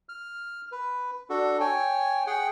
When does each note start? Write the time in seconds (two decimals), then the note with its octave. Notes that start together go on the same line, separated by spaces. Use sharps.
0.09 F6
0.72 B4
1.30 D4 F#4 A4
1.60 C#5 G5 G#5
2.27 G#4 F#5 G5